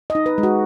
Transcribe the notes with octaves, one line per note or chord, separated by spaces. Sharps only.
D#5
D#4
B4
G#3
F#4